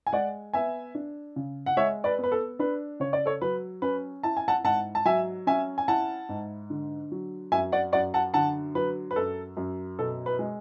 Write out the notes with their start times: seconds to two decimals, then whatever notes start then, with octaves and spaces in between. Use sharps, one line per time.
0.07 G#5
0.12 G#3 D5 F#5
0.53 B3 E5 G#5
0.95 D4
1.36 C#3
1.66 F#5
1.77 G#3 C#5 E5
2.04 B4 D5
2.19 B3
2.24 B4
2.32 A4
2.59 D4 B4
3.00 C#3 C#5
3.13 D5
3.26 A4 C#5
3.41 F#3 B4
3.82 C#4 B4
4.23 E4 A5
4.37 G#5
4.48 F#5 A5
4.64 G#2 F#5 A5
4.95 A5
5.05 F#3 E5 G#5
5.47 C#4 E5 G#5
5.78 G#5
5.88 E4 F#5 A5
6.29 G#2
6.70 D3
7.12 F#3
7.52 F#2 E5 G#5
7.72 D5 F#5
7.93 F#2 D5 F#5
8.14 F#5 A5
8.34 D3 F#5 A5
8.75 F#3 B4
9.11 B4
9.16 F#2 A4
9.57 F#2
9.99 B2 A4
10.26 B4
10.39 G#3